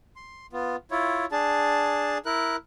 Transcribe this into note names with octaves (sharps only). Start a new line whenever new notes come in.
C6
B3 F4
E4 F4 C#5
D4 G#4 A5
E4 A#4 F#6